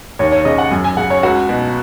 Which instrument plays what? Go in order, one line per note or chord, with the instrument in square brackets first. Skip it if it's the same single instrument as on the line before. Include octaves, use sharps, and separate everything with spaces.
[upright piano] D#2 C#5
C#5
C#3 D#5
F#5
F#2 G#5
G#5
C#3 F#5
C#5
C#2 F#4
B2